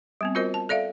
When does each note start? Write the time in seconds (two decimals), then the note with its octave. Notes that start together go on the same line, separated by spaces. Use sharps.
0.21 G3 B3 C4
0.35 F4 F#4 A#4 C5 D#5
0.54 A5
0.69 A4 D5 E5 F5